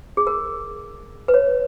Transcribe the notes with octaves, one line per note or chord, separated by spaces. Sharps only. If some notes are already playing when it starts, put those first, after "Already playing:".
G#4
A#4
B4
C#5